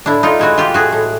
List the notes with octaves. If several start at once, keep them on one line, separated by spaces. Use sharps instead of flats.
A2 D4 E4
A2 D#4 F4
G#3 E4 F#4
E3 F4 G4
A2 F#4 G#4
A2